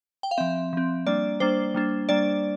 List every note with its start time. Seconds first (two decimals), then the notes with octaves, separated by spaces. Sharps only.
0.23 G5
0.31 F5
0.37 F3 C4 E5
0.73 F3 C4
1.07 G3 A#3 D4 D5
1.40 G3 A#3 D4 C5
1.74 G3 A#3 D4
2.09 G3 A#3 D4 D5